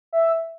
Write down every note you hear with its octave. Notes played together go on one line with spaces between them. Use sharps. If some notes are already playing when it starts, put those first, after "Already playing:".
E5